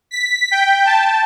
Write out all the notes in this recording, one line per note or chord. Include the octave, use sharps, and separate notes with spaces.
B6
G5
A5